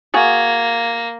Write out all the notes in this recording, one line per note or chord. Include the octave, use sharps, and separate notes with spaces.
A#3 F#4 G#4 F5 G#6 A6